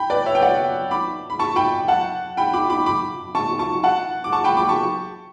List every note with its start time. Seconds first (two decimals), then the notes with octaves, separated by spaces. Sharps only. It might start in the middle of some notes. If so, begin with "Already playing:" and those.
Already playing: G5 B5
0.10 B4 D5
0.26 C#5 E5
0.35 G5
0.42 D5 F#5
0.91 B5 D6
1.30 B5
1.39 A5 C#6
1.56 G5 B5
1.88 F#5 A5
2.37 G5 B5
2.53 B5 D6
2.70 B5 D6
2.86 B5 D6
3.35 A5 C#6
3.59 A5 C#6
3.83 F#5 A5
4.24 D6
4.32 A5 C#6
4.44 G5 B5
4.57 B5 D6
4.69 A5 C#6